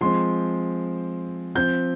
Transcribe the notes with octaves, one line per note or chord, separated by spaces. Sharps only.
F3 G#3 C4 C6
F3 C4 G6